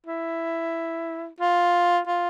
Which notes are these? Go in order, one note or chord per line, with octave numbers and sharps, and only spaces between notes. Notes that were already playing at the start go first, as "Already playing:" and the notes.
E4
F4
F4